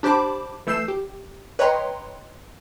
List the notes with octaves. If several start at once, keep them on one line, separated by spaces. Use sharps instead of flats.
D4 G4 C5 A5 B5 D6
E3 A3 E6 G6 C7 E7
G4
B4 C#5 D#5 G5 A#5 C6